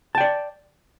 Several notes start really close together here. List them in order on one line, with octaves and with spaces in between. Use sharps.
A5 G5 D5